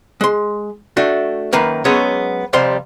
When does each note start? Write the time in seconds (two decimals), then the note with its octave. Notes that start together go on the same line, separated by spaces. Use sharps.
0.21 G#3 C6
0.97 A3 D4 F#4
1.53 F#2 D#3 A#3 B4
1.85 F#3 G#3 B3 C#4 G#4 C#5
2.53 F2 C3 G3 C5 F5 C6